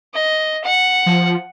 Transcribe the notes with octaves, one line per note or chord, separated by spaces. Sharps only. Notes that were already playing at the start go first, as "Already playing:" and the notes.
D#5
F#5
F3